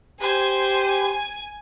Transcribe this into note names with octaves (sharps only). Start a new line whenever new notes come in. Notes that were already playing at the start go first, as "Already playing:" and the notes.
G4 C5 G#5